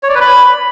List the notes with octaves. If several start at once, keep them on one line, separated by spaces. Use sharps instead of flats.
C#5
D5
B4
B5